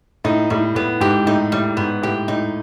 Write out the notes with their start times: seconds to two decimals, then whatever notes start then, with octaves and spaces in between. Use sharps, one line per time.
0.24 A2 D#4
0.50 A2 G3
0.75 A2 B3
1.00 G#2 G4
1.27 A2 D#4
1.52 A2 G3
1.77 G#2 B3
2.02 A2 G4
2.28 A2 D#4